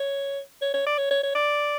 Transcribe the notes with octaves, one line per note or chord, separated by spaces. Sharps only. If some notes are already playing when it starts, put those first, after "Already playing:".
Already playing: C#5
C#5
C#5
D5
C#5
C#5
C#5
D5